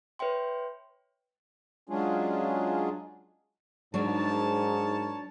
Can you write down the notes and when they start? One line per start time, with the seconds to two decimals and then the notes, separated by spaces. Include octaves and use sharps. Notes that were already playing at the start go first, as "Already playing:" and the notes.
0.19 B4 C#5 E5 G5 C6
1.90 F#3 G#3 C#4 D4 F4 G#4
3.94 G#2 F#3 D4 D#4 A#4 C#5 A5